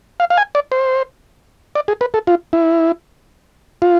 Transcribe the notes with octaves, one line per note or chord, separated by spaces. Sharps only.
F5
F5
G#5
D5
C5
D5
G#4
B4
A4
F4
E4
F4